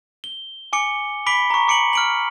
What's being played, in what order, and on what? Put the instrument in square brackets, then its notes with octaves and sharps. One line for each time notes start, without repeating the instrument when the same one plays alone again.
[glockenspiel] G7
G#5 D6 C#7 G7
B5 D6 B6 D7 G7
A#5 C#6
D6 C#7 D7 F#7
F6 D7 F#7